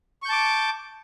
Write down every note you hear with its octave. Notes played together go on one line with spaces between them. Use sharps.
A5 C#6 D6 G6